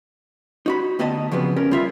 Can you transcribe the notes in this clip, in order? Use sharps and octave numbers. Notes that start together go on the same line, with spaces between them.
D#4 F#4 B5
D2 B3 G4 D#5 A5
C#3 F3 F#3 B3 C4
C#4 G4 A#4
G3 F4 E5